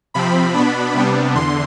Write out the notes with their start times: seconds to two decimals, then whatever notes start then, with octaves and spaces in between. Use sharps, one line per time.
0.14 C3 F3 C4 B5
0.54 B2 B3 D4
0.95 C3 G3 B3 D4
1.35 E2 D3 C6